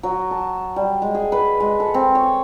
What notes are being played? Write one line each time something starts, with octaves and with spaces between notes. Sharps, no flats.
F#3
A5
G3
G#3
G#4
B4
G#3
A4
C4
C#5